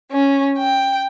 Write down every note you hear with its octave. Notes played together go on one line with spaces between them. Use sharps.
C#4
G5